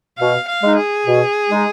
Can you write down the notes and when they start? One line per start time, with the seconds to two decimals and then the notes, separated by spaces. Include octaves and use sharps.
0.18 B2 F5
0.48 F5
0.62 G#3 D#4
0.76 G#4
1.06 B2
1.49 G#3 D#4